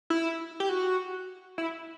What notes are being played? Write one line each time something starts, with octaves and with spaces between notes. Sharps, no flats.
E4
G4
F#4
E4